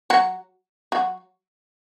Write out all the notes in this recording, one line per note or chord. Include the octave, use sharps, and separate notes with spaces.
F#3 F#4
F#3 F#4